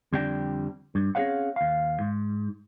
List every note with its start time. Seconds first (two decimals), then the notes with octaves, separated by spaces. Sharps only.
0.13 F2 D3 G3 C4 D4 G5
0.95 G2
1.15 C4 C#4 G#4 C#5 F5 F#5
1.56 D#2 F5
2.00 G#2